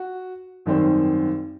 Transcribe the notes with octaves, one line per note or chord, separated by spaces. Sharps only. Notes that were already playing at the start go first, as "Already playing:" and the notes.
Already playing: F#4
G#1 F#2 D#3 G3 C4